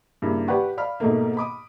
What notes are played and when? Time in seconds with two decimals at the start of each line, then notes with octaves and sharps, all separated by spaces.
0.22 G2 C#3 A#3 E4
0.48 G4 B4 D5 F#5 C#6
0.77 D5 F5 B5 F6
1.00 G#2 B2 A3 A#3
1.37 B5 D6 D#6